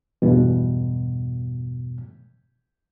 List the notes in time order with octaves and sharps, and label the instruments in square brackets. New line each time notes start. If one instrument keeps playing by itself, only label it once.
[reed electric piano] E2 G2 B2